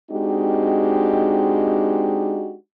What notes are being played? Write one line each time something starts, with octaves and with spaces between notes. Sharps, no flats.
G#3 C4 D4 D#4 F#4 G4